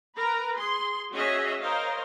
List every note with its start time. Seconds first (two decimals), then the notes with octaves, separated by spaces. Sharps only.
0.17 A#4 B4 A#5
0.55 G#4 C6
1.14 C#4 F#4 G#4 C#5 D#5 E5
1.61 A#4 C5 C#5 D#5 F5